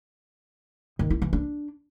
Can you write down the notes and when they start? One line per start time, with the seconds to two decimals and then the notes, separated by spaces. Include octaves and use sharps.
0.99 D#3
1.10 E4
1.22 E3
1.33 D4